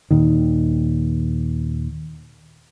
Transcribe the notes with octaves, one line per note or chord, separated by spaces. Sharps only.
D#2 A#2 D#3